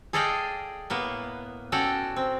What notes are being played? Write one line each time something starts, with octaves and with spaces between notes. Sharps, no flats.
G#4 A4 D5 D#5 F5 G5
A2 A#3 B3
C#4 F#4 A4 D5 G5
C4